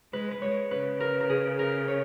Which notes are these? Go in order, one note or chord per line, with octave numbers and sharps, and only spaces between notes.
G#3 B4
B4
G#3 C#5
C#3 B4
A#4
A#4
G#4
A#4
C#5